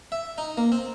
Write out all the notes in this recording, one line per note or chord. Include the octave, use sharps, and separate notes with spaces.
E5
D#4
A#3
C4